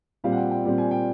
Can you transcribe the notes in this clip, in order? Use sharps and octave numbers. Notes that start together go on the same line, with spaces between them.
A#2 G3 C4 F5
F#5
G5
G5
A#2 G3 C4
G#5
G5